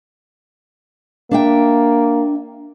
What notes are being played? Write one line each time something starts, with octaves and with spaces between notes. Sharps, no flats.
A#3 D4 E5 G5